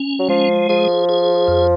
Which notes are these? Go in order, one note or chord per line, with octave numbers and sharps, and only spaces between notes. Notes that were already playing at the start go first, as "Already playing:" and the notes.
Already playing: C#4
F#3
F3 G#3
F3 G#4
G#4
F2